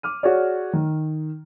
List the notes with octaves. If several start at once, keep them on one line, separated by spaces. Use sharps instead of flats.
D6 F6 D#7
F#4 G#4 C#5 D5
D#3